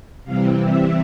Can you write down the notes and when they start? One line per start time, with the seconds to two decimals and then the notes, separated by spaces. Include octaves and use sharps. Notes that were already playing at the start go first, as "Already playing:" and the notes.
0.24 C3 E3 G3 C4 F5
0.59 E5